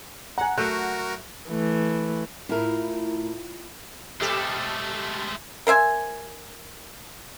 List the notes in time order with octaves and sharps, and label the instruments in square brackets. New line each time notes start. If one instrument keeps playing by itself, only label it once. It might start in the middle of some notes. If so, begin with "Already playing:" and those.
[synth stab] F#5 [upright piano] G#5 A#5
[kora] F#3 A3 [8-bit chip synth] F#4 A#4 [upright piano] F#6 G6
[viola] E3 A3
[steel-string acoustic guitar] A2 A#4 [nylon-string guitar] E4 F4
[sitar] B2 G4 A4 [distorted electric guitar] G#3 A3
[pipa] A#4 C5 E5 G#5